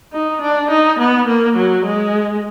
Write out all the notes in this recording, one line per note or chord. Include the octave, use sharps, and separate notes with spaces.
D#4
D4
D#4
B3
A#3
F#3
G#3